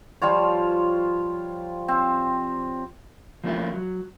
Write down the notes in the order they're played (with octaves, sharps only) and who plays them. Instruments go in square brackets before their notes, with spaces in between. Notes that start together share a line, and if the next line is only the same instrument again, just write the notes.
[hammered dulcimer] F3 G3 F4 C#5
C4
[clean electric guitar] F3 A3 A#3 C#4 E4 F4
F#3